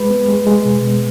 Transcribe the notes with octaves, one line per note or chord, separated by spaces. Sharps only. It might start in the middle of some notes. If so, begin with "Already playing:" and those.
Already playing: G#3 B4
B3
G#3
G#3
B2
B2